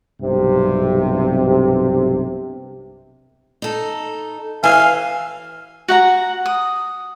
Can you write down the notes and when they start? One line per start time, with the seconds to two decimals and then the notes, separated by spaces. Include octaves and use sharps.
0.21 B1 G2 C3
3.62 D#4 A4
4.64 E3 F5 G#5
5.88 F#4 F#5 A#5
6.46 D#6